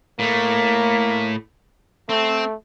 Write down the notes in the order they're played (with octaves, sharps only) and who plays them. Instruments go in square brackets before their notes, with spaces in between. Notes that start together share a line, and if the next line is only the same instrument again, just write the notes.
[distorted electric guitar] A2 A3 [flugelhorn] A#3
[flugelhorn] A3 [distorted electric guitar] C4